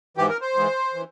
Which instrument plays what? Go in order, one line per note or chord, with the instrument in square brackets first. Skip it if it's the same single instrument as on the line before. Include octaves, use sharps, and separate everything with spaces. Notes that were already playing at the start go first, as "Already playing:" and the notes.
[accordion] G#2 E3 G4
A#4
C5
G#2 E3
E3